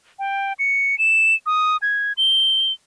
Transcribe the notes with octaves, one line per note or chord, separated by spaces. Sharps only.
G5
C#7
E7
D#6
G#6
G7